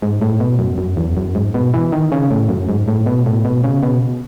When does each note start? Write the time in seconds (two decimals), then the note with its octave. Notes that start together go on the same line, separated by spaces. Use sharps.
0.02 G#2
0.22 A2
0.40 B2
0.59 F#2
0.78 F#2
0.97 E2
1.17 F#2
1.35 G#2
1.54 B2
1.74 E3
1.92 D#3
2.12 C#3
2.31 A2
2.49 F#2
2.69 G#2
2.88 A2
3.06 B2
3.26 A2
3.45 B2
3.64 C#3
3.83 B2